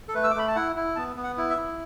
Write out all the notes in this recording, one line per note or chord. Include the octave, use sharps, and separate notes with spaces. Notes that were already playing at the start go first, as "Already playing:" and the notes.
A4
A3 B4
E6
D6
A3 B5
A5
E4 F#5
E4
B3 A5
B3
F#5
E4
E5
E4